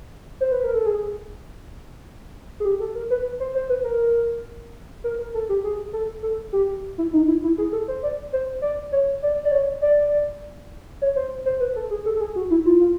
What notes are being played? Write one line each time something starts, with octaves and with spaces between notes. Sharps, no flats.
C5
B4
A#4
A4
G#4
G#4
G4
A4
A#4
B4
C5
C5
B4
A#4
A#4
A#4
A4
G4
G#4
A4
A4
G4
E4
D#4
E4
E4
G#4
A4
C5
D5
C5
D5
C#5
D5
D5
C#5
D5
C#5
C5
C5
B4
A4
G#4
A4
A4
G#4
F#4
E4
F4
F4